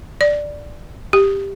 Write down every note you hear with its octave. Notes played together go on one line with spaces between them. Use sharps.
D5
G4